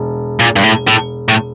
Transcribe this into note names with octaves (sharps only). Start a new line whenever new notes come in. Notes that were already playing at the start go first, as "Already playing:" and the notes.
Already playing: E1
A#2
G2
A2
A2
A2